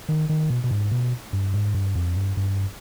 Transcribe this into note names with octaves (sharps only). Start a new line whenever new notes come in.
D#3
D#3
B2
B2
G#2
B2
G2
G#2
G2
F2
G2
G2